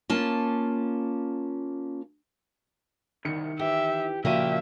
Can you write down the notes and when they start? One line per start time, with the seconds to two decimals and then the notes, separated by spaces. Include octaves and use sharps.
0.10 A#3 C#4 F4 A5
3.25 C2 D#3 C#7
3.60 E3 G4 E5
4.25 A#2 C#3 F3 A#3 F#4 G4 E5 D#7